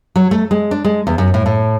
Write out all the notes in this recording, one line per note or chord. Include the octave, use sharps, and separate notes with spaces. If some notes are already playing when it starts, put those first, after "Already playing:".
F#3
A3
G#3
D4
G#3
E2
F#2
A2
A2